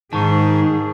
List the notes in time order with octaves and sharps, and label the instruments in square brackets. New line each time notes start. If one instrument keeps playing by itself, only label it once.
[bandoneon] G#2 [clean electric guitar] D#3 [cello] G#4 [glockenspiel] A5 C#6